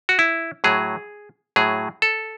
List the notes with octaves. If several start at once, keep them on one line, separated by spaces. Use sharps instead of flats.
F#4
E4
A2 F#3 G#4
A2 F#3 G#4
A4